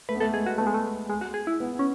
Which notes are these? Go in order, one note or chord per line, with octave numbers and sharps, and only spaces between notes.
A3 B4
B3
A3 A4
G#3 G#4
F#4
A3 B3
G#3
A3
G#3
F#4
G#4
E4
B3
C#4